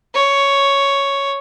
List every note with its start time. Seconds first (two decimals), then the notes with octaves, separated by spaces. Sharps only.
0.14 C#5